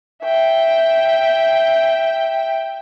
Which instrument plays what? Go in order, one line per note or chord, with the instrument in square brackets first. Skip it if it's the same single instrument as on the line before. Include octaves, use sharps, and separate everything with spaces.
[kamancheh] E5 G5